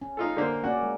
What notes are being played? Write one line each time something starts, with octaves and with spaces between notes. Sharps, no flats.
C#4
D#4 F4 A4
D3 A#3 C5
A#3 C#4 F#4 D5
G#3